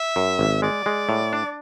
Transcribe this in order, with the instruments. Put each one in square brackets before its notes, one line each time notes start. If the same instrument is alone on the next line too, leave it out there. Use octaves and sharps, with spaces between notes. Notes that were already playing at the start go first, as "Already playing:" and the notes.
Already playing: [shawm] E5
[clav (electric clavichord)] F#2
G#1
[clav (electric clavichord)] G#3 [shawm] D5
[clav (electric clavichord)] G#3
A2
D4